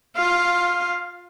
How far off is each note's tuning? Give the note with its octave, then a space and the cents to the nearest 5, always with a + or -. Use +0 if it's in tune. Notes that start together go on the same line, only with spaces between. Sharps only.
F4 +15 F5 +0